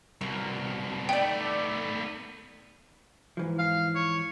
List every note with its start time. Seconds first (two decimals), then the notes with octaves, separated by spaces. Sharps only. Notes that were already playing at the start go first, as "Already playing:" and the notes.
0.21 C2 B2 A#4
1.09 A3 B3 D#4 D5 G5
3.37 G#2 E3 F3
3.59 F5
3.96 C#5